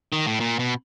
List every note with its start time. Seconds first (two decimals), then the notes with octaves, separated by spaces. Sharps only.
0.13 D#3
0.27 A2
0.40 A#2
0.59 B2